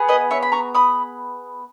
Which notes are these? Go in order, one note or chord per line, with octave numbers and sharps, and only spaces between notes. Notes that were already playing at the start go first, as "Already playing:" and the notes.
Already playing: B3 G#4
B4 D#5
C#5 E5
B5
A#5 C#6
B5 D#6